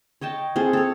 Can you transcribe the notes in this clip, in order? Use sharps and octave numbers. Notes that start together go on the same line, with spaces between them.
C#5 D#5 G5 A5
C4 F4 G#4 A4
A4 C#5